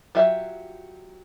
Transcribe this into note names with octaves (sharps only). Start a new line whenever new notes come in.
F#3 F4 G4 E5